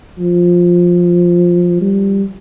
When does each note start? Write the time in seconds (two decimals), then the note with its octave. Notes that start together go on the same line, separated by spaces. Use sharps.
0.19 F3
1.81 G3